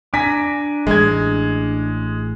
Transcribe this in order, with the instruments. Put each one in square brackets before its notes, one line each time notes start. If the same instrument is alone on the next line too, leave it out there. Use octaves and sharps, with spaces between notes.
[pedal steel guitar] D4 A#5 [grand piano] G#5 B6
[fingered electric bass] A1 [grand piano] G#3 G#6